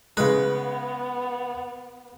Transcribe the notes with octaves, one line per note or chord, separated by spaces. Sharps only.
C#3 G#3 B3 B4